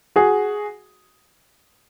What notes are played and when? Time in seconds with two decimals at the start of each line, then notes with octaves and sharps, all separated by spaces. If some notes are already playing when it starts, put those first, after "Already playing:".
0.16 F#4 G#4